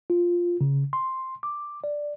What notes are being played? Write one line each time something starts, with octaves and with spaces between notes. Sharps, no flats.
F4
C#3
C6
D6
D5